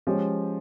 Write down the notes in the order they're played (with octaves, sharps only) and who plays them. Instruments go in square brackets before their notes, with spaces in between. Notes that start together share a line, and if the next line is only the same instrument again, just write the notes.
[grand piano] F3 [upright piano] G#3 C#4 G4 C#5